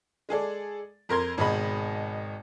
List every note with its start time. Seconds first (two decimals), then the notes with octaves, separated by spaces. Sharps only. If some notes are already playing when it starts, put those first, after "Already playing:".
0.29 G#3 G#4 A4 D5
1.09 F2 A#4 C6 G#6
1.38 G#1 B2 G#3 D#5 B5